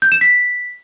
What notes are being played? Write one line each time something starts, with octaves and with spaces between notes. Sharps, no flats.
G6
E7
B6